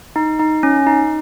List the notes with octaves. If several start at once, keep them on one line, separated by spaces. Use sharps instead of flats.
D#4
D#4
C#4
D#4